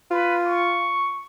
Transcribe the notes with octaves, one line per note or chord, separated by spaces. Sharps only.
F4 B4
C#6